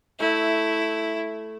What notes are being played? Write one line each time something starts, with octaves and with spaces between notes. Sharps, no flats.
A3 E4